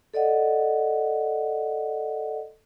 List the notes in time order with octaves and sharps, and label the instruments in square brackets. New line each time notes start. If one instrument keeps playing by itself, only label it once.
[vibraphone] A4 D5 D#5 F#5